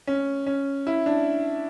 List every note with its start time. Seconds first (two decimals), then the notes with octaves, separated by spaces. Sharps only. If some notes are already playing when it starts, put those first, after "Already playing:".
0.07 C#4
0.46 C#4
0.87 E4
1.06 D4